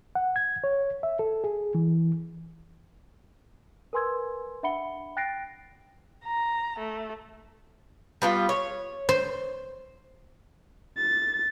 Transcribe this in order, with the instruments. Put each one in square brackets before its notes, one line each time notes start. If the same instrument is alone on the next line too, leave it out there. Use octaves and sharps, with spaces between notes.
[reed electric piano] F#5
G#6
C#5
E5
A4
G#4
E3
[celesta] A#4 B4 G#5 C6 E6 G#6
D4 E5 F#5 B5 C#7 G7
G5 F#6 A6 A#6 C7 D7
[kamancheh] A#5
A3
[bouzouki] G3 B3 F4
C#5
[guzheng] C5
[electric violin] A6